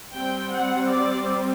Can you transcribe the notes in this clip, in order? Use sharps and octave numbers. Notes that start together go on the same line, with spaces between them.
G3 C4 G5
F#5
D5